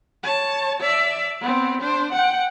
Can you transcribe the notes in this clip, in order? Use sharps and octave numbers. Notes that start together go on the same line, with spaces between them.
C#5 A5
D5 E5
B3 C4
D4 C5
F#5 G5